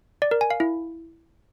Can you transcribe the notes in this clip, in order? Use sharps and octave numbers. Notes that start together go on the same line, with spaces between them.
D5
A#4
G#5
F5
E4